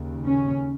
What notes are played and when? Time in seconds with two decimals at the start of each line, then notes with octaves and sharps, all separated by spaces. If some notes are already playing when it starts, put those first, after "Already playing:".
Already playing: D#2 C#3
0.25 C#4